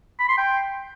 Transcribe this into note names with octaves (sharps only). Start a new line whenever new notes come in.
B5
C6
G5